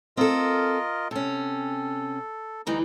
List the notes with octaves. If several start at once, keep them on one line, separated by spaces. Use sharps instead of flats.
C4 F4 A4 A#4 D#5
C3 C#4 A4
D2 E3 G3 D#4 A#5